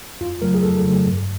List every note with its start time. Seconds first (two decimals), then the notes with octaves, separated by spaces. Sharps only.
0.21 F2 F4
0.42 C#3 F#3 A3 A#4
0.54 G#4
0.63 F2 A4
0.84 C#3 F#3 A3
1.06 G2